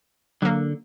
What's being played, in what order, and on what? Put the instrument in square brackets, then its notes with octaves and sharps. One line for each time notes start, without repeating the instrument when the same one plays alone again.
[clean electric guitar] D3 [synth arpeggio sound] F#3 A#3